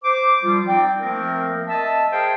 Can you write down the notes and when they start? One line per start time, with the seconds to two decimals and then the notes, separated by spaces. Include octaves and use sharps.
0.04 C5 D6
0.43 F3 G3 F4
0.66 C4 D#4 D5 G5
1.00 F3 A3 A#3 C4 A#4
1.67 D#5 E5 A5
2.11 G#4 A#4 C5 F5 G5 A5